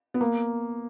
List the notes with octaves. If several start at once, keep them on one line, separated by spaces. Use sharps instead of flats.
B3
A#3